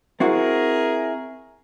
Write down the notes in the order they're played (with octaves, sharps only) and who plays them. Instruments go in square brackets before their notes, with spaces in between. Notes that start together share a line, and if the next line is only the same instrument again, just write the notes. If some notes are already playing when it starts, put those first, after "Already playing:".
[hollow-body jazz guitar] C4 E4 F#4 [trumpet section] G#4 A#4